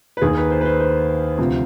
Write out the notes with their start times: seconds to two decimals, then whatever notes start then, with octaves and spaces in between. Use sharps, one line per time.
0.17 B4
0.22 D#2 D#3 G#4
0.37 B4
0.51 C5
0.61 B4
0.65 C5
0.80 C5
1.38 D2 C3 F3